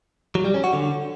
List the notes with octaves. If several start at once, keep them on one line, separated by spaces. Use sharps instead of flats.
F#3
G3
C#4
F#4
D3